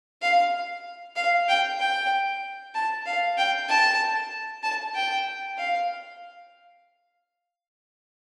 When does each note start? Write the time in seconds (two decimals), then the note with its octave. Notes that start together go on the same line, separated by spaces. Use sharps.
0.22 F5
1.16 F5
1.48 G5
1.79 G5
2.75 A5
3.06 F5
3.38 G5
3.69 A5
4.63 A5
4.95 G5
5.58 F5